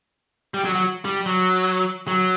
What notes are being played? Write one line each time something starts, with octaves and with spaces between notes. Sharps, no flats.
G3
F#3
F#3
G3
F#3
F#3